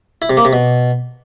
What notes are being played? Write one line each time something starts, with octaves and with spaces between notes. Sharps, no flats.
E4
C3
A#3
C3
B2